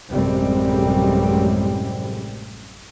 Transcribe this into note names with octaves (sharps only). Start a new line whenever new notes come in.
A1 F#2 C3 G3 G#3 C4